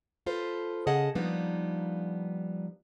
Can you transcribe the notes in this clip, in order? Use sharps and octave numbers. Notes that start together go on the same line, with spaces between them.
F4 A4 B4 C5
C#3 G#4 D#5 F#5 A5
F3 G3 A#3 B3 D4 D#4